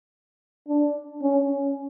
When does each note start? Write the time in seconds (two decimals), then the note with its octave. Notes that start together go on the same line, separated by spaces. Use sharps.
0.68 D4
1.22 C#4